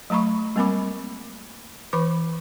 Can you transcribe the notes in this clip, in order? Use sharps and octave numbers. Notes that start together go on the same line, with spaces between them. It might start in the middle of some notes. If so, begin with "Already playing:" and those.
F#3 A3 A#5 B5 C#6
G3 A#3 C4 A#4 B5 D6
E3 B4 B5 D6